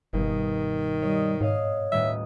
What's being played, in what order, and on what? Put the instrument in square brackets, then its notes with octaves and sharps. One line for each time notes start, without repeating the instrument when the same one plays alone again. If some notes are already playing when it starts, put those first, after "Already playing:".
[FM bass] F#1 [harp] G2 B2 [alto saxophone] D#3
[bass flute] G3 [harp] C#5 D#5
[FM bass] G#2 [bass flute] C#5 [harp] D#5 F5 C7
[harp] D#1 A2 D#6 [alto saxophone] E5